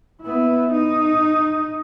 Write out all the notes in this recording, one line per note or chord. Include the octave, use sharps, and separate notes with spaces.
B3 E4
D#4